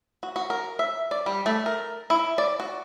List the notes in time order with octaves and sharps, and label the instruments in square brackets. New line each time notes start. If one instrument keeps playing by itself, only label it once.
[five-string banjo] F#4
F#4
A#4
E5
D5
G3
A3
A#4
E4
D5
F#4